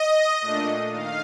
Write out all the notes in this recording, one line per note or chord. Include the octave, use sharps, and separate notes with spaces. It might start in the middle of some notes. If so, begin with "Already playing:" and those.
Already playing: D#5
A#2 A3 D4
D#3 F5